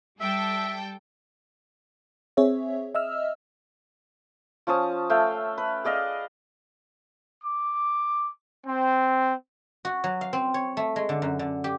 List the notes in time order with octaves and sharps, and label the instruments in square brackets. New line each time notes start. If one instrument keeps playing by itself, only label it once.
[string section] G3 A4 G5 [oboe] E5
[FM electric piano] C4 G#4 C#5 E5
D#5 E5 E6 F6
[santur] F3 C#4 A5 D#6
A3 E5 F5 G5
B4
G#4 D5 D#5 F5
[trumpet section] D6
C4
[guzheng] F#4
F#3
F5
C4
C#5
A3
G#3
D3
F#2
D3
G4